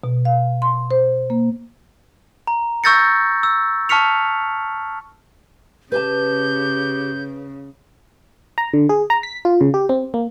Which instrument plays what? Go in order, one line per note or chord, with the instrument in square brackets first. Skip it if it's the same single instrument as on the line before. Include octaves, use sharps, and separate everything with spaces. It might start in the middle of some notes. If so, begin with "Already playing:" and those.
[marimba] B2
F5
C6
C5
A#3
[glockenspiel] A#5
C#6 E6 G6 A6 A#6 C#7
E6
A5 C#6 F6 B6 C#7 F7
[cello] C#3 [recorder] G4 [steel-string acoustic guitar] B4 G#5 A5 [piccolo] G6
[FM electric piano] A#5
D3
G#4
A#5
B6
F4
C#3
G4
C4
A#3